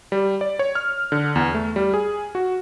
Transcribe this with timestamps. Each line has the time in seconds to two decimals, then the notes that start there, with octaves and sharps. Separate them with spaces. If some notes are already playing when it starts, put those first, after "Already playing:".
0.12 G3
0.41 D5
0.59 C#5
0.75 F6
1.12 D3
1.36 E2
1.55 A3
1.76 G3
1.94 G#4
2.35 F#4